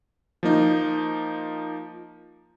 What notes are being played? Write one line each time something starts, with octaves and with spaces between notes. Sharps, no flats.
F3 A#3 D#4